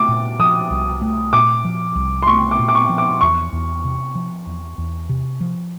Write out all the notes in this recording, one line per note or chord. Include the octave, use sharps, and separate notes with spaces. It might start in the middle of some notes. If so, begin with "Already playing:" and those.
Already playing: A3 D6
A#2
F3 D#6
C2
A3
A#2 D6
F3
C2
C6
A3 C#6
D6
A#2
D6
C#6
F3
D6
E2 C#6
E2
C3
F3
E2
E2
C3
F3